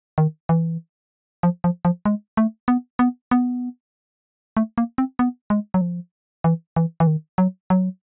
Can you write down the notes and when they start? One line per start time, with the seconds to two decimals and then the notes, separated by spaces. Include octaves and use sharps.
0.18 D#3
0.49 E3
1.43 F3
1.64 F3
1.85 F3
2.05 G#3
2.37 A3
2.68 B3
2.99 B3
3.31 B3
4.57 A3
4.78 A#3
4.98 C4
5.19 B3
5.50 G#3
5.74 F#3
5.81 F3
6.44 E3
6.76 E3
7.00 E3
7.07 D#3
7.38 F#3
7.70 F#3